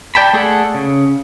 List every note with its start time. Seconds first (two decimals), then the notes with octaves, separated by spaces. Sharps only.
0.15 D5 G5 A5 B5
0.33 A3 G#4 A4 D5 F#5
0.75 C#3